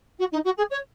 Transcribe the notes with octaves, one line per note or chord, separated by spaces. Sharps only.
F#4
D#4
F#4
G#4
C#5